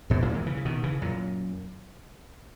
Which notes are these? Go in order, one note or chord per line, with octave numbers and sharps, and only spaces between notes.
G#2 B2
F#2 A#2
E3 G#3
C#3 E3
C#3
B2 D#3
C#3 E3
F#2 A#2